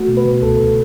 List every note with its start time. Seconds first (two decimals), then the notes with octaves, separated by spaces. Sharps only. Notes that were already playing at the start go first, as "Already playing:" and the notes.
Already playing: A3 F#4
0.08 B2
0.17 B4
0.25 B2
0.42 C#2 A4
0.59 C#2